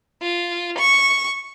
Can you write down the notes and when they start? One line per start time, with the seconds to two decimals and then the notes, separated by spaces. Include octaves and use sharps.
0.22 F4
0.78 C#6